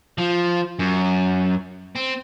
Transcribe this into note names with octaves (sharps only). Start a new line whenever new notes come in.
F3
F#2
C4